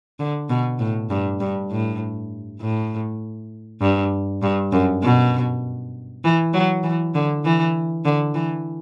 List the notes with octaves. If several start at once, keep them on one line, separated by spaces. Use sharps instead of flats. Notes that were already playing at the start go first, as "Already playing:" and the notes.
D3
B2
A2
G2
G2
A2
A2
G2
G2
F#2
B2
E3
F#3
E3
D3
E3
D3
E3